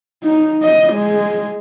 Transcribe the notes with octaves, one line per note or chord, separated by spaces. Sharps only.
D#4
D#5
G#3